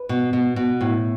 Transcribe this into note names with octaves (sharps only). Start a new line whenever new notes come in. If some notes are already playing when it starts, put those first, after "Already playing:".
Already playing: B4
B2
B2
B2
A2